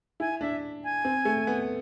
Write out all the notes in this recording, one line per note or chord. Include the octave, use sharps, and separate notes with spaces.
E4 G#5
D4 E5
G#5
C4
A3
B3